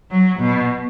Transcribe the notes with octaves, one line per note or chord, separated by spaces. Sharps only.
F#3
B2